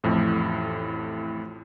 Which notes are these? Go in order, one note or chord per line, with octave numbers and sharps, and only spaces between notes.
A1 F2 A2